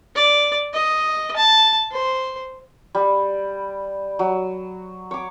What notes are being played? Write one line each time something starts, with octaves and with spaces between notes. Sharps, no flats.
D5
D#5
A5
C5
G3
F#3
C#5 D6